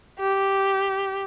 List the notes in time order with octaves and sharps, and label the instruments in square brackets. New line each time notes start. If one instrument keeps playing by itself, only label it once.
[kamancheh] G4